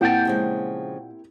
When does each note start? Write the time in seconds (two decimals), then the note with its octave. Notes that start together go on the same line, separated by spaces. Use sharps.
0.01 A#2 A#3 C4 E4 G4 F#5 G5 A5
0.25 C#3 F3 G#3